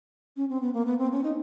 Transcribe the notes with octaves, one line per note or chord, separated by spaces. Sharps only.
C#4
C4
B3
A#3
B3
C4
C#4
D#4